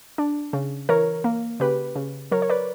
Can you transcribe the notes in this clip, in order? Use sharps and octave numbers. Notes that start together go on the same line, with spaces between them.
D4
C#3
E3 A#4 C#5
A#3
C#3 G4 B4
C#3
F#3 A#4 C#5
C#5
B4 D5